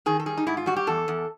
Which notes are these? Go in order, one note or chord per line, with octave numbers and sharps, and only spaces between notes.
D#3 G#4
A4
G3 G#4
D#4
G#2 E4
F4
G3 F#4
G4
E2 A4
E2